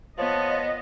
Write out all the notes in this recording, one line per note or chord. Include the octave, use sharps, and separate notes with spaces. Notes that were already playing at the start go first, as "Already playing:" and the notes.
F3 B3 C#5 D#5 A5